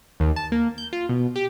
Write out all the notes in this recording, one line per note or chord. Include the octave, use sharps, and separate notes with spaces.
D#2
A5
A#3
G6
F4
B2
G4